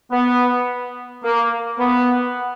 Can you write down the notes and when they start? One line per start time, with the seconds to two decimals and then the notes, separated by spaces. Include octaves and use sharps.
0.11 B3
1.24 A#3
1.79 B3